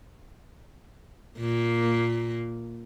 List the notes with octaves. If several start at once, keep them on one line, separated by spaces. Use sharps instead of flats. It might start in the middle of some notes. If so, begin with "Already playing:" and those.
A#2 A#3